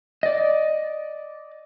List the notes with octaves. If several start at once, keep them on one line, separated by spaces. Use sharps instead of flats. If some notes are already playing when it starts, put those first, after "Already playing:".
D5 D#5